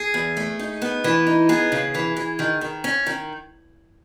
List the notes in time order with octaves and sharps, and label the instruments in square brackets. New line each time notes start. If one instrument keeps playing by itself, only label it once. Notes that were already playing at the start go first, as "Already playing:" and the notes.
Already playing: [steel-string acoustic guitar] G#4
E2
A3
D#4
B3
E3
D#4
B3 G#4
C#3
E3
E3
D#3
D#3
C#4
D#3